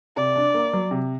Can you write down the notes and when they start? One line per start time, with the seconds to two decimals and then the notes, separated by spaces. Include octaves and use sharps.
0.17 C3 D5
0.36 D4
0.54 A#3
0.73 F#3
0.91 C3